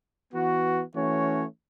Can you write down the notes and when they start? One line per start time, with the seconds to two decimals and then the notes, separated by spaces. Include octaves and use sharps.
0.32 E3 B3 F#4
0.94 E3 A3 C#4 F#4 C#5